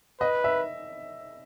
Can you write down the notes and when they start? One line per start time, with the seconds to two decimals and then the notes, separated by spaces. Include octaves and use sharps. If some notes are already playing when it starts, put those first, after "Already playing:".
0.20 B4 D#5
0.44 E5